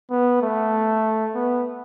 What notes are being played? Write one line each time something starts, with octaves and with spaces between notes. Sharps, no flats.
B3
A3
B3